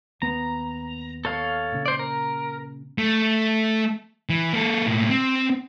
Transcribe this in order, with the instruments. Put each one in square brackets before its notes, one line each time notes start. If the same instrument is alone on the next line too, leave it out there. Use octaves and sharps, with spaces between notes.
[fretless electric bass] D#2 B3 [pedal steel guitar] A#5
[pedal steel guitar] A4 C#5 F5
[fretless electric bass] A#2 C#3
[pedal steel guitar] C5 D5
A#4
[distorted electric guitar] A3
E3
A#3 A4
A2 A#3
C4